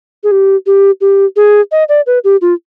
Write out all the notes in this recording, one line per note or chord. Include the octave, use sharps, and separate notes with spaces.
G#4
G4
G4
G4
G#4
D#5
D5
B4
G4
F4